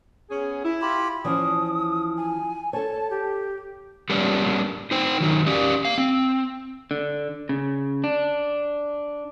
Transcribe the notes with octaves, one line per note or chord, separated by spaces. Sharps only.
B3 C#4 G#4
E4
F4 G4 B5
E3 F3 C#4 D#6
G#5
A4 C#5 A5
G4
G3 A#3 B3 C#4 D4
D#4 C5 G5
D#3 F#3 D#4
C#4 G4 D5
A#3 F5
C4
D3
C#3
D4